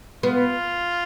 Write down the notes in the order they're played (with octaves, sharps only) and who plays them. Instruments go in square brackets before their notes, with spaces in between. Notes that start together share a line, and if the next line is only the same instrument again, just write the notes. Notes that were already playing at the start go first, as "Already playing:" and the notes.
[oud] B3 [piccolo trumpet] F4